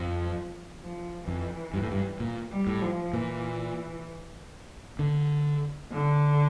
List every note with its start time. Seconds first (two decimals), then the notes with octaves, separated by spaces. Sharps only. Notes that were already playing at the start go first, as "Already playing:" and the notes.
Already playing: F2 F3
0.81 F3
1.27 F2 E3
1.74 G2
1.82 A2
1.91 G2
2.20 A#2
2.51 G3
2.67 A2
2.82 F3
3.13 A#2 E3
4.99 D3
5.91 D3